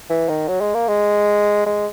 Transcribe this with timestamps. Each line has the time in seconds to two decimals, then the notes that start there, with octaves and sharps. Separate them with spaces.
0.10 E3
0.29 D#3
0.48 F#3
0.61 G#3
0.75 A#3
0.88 G#3
1.66 G#3